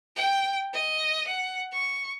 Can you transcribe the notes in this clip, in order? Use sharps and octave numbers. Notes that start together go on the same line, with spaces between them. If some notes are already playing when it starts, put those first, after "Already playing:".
G5
D#5
F#5
C#6